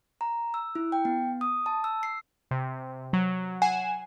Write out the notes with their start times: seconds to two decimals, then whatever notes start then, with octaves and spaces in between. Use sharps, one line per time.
0.21 A#5
0.54 E6
0.75 E4
0.92 G5
1.05 B3
1.41 D#6
1.66 A5
1.84 E6
2.03 C7
2.51 C3
3.13 F#3
3.62 F#5 G#5 C7 E7